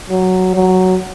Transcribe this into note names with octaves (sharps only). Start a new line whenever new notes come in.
F#3
F#3